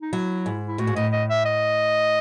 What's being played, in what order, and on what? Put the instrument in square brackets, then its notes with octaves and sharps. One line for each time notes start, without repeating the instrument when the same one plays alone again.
[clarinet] D#4
[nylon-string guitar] F#3 [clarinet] E4
[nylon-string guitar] G#2
[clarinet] E4
[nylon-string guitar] A2 [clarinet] F#4
[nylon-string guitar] G#2
[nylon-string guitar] A2 [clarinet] D#5
[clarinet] D#5
E5
D#5